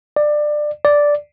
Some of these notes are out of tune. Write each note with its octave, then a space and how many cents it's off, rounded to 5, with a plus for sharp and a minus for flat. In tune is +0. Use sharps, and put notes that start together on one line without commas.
D5 +20
D5 -5